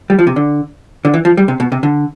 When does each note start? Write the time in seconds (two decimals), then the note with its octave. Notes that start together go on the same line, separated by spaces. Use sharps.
0.10 G3
0.19 F3
0.27 C3
0.36 D3
1.05 D3
1.14 E3
1.25 F3
1.37 G3
1.48 C3
1.60 B2
1.72 C3
1.83 D3